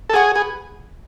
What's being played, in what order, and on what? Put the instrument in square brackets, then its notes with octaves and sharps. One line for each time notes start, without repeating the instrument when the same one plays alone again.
[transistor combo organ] A4
[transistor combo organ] G#4 [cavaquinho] C#5 F#5 C#6
[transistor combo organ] G#4 [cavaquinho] B4